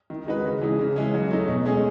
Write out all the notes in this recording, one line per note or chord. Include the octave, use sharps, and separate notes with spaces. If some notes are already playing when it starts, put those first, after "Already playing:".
D#3
G#3 D#4 F#4 B4
C#3
E3 G#3 D#4
C#3
E3 G#3 C#4
F#3
A3 D#4
B2
G#3 C#4 G#4